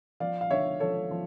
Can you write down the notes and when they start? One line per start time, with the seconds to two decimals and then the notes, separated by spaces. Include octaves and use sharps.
0.20 F3 D5 F5
0.41 F5
0.50 D3 C#5 E5
0.80 F3 A4 C#5
1.11 F3